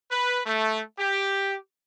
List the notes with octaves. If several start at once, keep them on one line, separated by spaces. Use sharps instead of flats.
B4
A3
G4